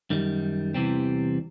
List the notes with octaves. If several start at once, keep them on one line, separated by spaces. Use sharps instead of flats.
F#2 D#3 G3
E2 C3 E3 G3 C4